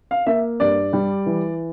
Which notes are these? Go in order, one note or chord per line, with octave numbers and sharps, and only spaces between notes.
F5
A#3 E5
G2 D5
G3
E3